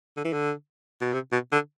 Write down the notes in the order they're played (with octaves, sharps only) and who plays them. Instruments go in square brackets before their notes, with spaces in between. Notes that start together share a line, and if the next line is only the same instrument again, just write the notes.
[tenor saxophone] D3
E3
D3
B2
C3
B2
D3